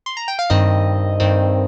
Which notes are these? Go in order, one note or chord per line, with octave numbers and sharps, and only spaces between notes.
C6
A#5
G5
F5
G2 D#3 C4 D#5
G2 D#3 C4